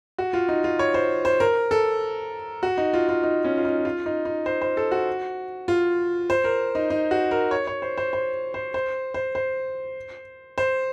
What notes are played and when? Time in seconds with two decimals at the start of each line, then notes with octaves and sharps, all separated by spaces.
0.18 F#4
0.33 F4
0.49 D#4
0.64 F4
0.79 C#5
0.94 C5
1.25 C5
1.40 A#4
1.71 A4
2.63 F#4
2.78 D#4
2.94 F4
3.09 F4
3.23 D#4
3.44 C#4
3.57 F4
3.65 D#4
3.85 F4
4.06 D#4
4.25 D#4
4.46 C5
4.61 C5
4.77 A4
4.91 F#4
5.68 F4
6.30 C5
6.44 A#4
6.75 D#4
6.90 D#4
7.11 F#4
7.31 A#4
7.51 C#5
7.67 C#5
7.82 C5
7.98 C5
8.13 C5
8.54 C5
8.74 C5
9.14 C5
9.35 C5
10.58 C5